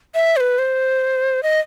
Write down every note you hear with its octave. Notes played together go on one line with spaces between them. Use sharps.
E5
C5
B4
C5
D#5